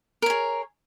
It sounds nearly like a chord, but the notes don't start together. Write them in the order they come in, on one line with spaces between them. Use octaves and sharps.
A#4 C#5 G#4